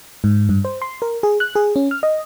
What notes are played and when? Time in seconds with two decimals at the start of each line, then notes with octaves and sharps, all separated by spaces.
0.24 G#2
0.49 G2
0.65 C5
0.82 C6
1.02 A#4
1.23 G#4
1.40 F#6
1.55 G#4
1.76 C#4
1.91 F6
2.03 D#5